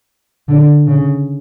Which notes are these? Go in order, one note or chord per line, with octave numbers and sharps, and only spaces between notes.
D3
C#3